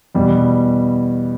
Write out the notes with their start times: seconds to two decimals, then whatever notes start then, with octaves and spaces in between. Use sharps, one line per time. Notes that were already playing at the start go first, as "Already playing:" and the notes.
0.15 E2 B2 G3